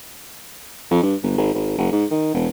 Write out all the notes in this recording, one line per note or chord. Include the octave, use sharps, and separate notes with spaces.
F2
G2
G1
G#1
G#1
F#1
G#2
D#3
E1